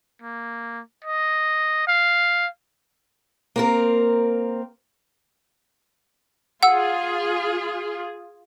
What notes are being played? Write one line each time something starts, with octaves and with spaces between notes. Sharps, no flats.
A#3
D#5
F5
A#3 C4 A#4
F4 G#4 F#5 E6